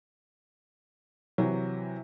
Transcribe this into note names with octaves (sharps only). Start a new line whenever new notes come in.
C3 E3 F#3